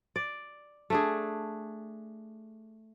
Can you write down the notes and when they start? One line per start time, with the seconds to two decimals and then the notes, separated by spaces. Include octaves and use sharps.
0.16 D5
0.90 A3 D4 G#4